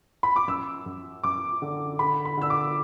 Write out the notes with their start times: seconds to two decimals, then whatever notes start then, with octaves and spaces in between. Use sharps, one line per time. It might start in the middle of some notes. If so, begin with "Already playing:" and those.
0.23 B5
0.36 D6
0.48 F#2 E6
0.86 F#2
1.23 F#2 D6
1.62 D3
1.99 D3 B5
2.25 B5
2.37 D3 E6
2.50 D6